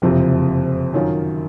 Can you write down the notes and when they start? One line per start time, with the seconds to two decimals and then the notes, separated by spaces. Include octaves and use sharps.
0.02 F#1 F2 C3 F3 C4
0.93 F#2 D#3 F#3 C#4 F4